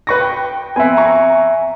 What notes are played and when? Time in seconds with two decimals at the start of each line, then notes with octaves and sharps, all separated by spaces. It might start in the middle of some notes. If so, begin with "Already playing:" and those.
0.07 B4 C#6 A#6
0.21 G5
0.76 B3 C4 E5 G#5
0.97 A#5 C#6